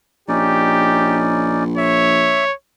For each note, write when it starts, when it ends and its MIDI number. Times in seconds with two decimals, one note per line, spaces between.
0.28 2.51 34
0.28 1.64 61
0.28 1.64 63
0.28 1.21 67
0.28 1.64 74
1.78 2.54 73
1.78 2.44 76